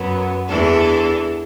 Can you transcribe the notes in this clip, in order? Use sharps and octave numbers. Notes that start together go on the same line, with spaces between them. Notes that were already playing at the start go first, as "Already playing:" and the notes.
Already playing: F#2 F#3 B3
E2 E3 D4 A4